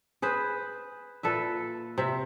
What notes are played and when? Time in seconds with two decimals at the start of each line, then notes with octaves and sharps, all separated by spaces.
0.22 G#4 B4 C5
1.23 A#2 A4 B4 E5
1.98 C3 E5